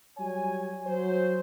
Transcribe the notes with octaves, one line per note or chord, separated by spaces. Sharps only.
F#3 G3 C#5 G#5
F#3 C5